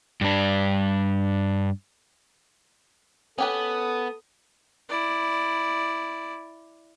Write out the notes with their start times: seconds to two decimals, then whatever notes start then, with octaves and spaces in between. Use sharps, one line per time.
0.21 G2 D4
3.38 B3 C#4 G4 A4 B4 D#6
4.89 E4 D5